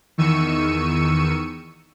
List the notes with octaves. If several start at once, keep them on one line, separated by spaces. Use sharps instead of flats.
E2 D#3 C#6 E6 C#7 D#7